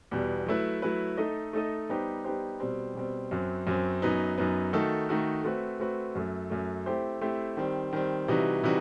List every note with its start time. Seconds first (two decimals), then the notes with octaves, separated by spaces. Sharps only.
0.11 E2 B2 G3
0.46 F#3 A3 E4 B4
0.82 F#3 A3 E4 B4
1.17 A3 D#4 A4 D#5
1.53 A3 D#4 A4 D#5
1.89 G3 B3 D#4 G4 C5
2.24 G3 B3 D#4 G4 C5
2.60 B2 G3 C4
2.95 B2 G3 C4
3.31 F#2 F#3 C4
3.67 F#2 F#3 C4
4.02 F#2 F#3 B3 D#4
4.38 F#2 F#3 B3 D#4
4.73 D#3 A3 D#4 F#4 A4
5.09 D#3 A3 D#4 F#4 A4
5.44 A3 C4 F#4 B4
5.80 A3 C4 F#4 B4
6.15 F#2 F#3 A3
6.50 F#2 F#3 A3
6.86 A3 C4 E4 G4 C5
7.21 A3 C4 E4 G4 C5
7.57 D#3 G3 C4
7.93 D#3 G3 C4
8.28 C3 E3 G3 D#4 F#4
8.63 C3 E3 G3 D#4 F#4